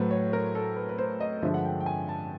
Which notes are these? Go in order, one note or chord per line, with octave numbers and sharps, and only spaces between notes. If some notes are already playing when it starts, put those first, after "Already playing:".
Already playing: A2 F#3 A3 B4 C5
C#5
A#4
A4
B4
B4
C5
D#5
G2 D3 F3 G#3 E5
F#5
G5
G5
G#5
A5